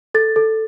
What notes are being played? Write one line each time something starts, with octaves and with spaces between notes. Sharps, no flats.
A4 A6
A4